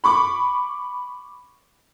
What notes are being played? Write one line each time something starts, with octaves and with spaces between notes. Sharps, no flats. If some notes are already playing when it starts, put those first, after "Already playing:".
B5 C#6 D6